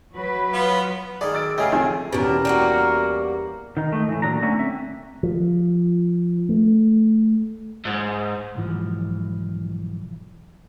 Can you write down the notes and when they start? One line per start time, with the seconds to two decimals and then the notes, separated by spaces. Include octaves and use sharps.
0.14 F#3 B4
0.53 B3 F4
1.21 D#3 G#4 D5
1.34 E6 A6 D7
1.58 C#3 A3 G4 G#4 D#5 F5
1.72 A#1 D#3 C4 G#5
2.13 E2 B2 C#4 D4 G4 A#4
2.45 G3 A#3 F#4
3.77 D#3 D#4
3.92 A3 D#4
4.08 A2 E3
4.22 A#2 F#3 D4 A#5
4.43 D3 A3 C#4
4.56 C4 E5
5.23 F3
6.49 A3
7.85 G#2
8.55 B1 G#2 E3 F3